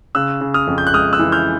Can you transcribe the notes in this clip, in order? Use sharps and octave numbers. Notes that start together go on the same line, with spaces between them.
C#3 E6 F#6
C#3
D#6 F6
F2
G6
F#6
G#3 D#6 F6
E6 F#6
E3
F6 G6